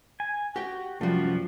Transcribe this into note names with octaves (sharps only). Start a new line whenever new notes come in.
G#5
F#4 G4 G5
C2 F#2 F3 G3 A3 F#4